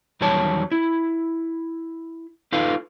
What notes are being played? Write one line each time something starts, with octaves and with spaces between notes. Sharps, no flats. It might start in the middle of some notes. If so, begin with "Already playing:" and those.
E2 D#3 F#3 G3 C#5 A5
E4
D#4 F4 A4 B4 F5